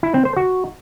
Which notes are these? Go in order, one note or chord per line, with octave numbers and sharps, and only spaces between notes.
E4
C4
C5
F#4